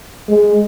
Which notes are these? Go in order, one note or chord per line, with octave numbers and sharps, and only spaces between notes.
G#3